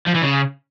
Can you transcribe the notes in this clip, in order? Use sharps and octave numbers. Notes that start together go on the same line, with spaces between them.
F3
E3
C#3